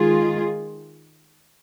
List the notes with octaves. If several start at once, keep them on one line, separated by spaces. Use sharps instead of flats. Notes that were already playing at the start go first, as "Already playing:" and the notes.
Already playing: D#3 G#3 F4 G#4